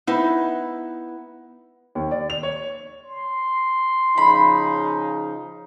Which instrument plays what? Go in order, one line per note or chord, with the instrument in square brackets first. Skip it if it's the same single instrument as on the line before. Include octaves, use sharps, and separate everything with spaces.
[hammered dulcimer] B3 [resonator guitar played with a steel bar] D#4 E4
[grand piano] D#2
D5
F7
C#5
[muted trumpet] C6
[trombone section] C#3 F3 D#4 [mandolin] B5